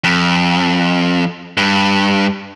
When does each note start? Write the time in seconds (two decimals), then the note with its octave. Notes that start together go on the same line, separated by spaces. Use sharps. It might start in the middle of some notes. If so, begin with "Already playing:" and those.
0.04 F2
1.57 G2